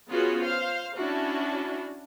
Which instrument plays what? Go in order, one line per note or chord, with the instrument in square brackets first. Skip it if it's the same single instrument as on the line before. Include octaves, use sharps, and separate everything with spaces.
[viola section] B3 C#4 F4 F#4 G#4
C5 F5
C#4 D4 E4 F#4